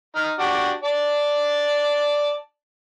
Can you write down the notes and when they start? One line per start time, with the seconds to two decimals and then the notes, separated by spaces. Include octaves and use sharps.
0.16 D#4 F6
0.39 D4 F#4 G4
0.84 D5 A5